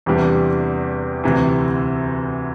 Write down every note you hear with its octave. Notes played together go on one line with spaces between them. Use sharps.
E2 C3 E3 G3 D4
D2 C3 E3